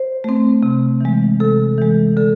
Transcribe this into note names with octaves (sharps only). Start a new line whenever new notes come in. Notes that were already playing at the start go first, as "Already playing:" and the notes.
Already playing: C5
A3 C4
C3
E3 G#3
C3 A4
E3 G#3
D3 A4